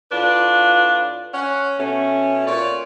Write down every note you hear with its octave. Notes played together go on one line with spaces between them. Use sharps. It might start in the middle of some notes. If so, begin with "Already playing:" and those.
A2 D4 F4 B4
C#4 F#5
B2 A3 C#4
A#2 C#5 D5